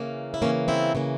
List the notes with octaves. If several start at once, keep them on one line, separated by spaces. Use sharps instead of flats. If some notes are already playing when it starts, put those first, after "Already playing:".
Already playing: C#3 E3 A#3
E4
C#3 E3 A#3 C#4
C4 E4
C#3 E3 A#3